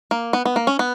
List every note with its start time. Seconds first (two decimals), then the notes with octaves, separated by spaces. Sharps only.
0.11 A#3
0.33 B3
0.45 B3
0.56 A#3
0.67 C#4
0.79 B3